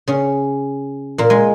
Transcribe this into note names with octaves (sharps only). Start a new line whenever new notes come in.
C#3 C#4
A#2 A#3
G#3